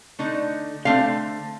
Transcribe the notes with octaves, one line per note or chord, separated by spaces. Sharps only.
D3 A3 D#4
D3 A3 C4 F5